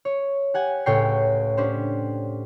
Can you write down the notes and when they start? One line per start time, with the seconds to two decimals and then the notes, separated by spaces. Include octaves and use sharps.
0.05 C#5
0.54 G4 F#5 G#5
0.86 C#2 A2 C#5 G5 C7
1.57 C#4 D4 G4 C5